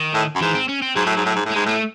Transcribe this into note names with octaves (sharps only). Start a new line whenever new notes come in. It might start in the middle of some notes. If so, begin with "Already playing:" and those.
Already playing: D#3
A2
F#2
G#2 E3
C4
C#4
C4
G#2 F#3
A2
G#2
A2
G#2
A2
G#2 G#3
A2 A3